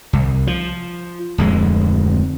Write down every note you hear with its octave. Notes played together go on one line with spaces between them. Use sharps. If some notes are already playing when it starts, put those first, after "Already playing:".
C2
F3
D1 F2 G#3